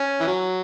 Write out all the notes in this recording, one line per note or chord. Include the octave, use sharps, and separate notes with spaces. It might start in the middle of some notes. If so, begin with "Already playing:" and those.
Already playing: C#4
E3
F#3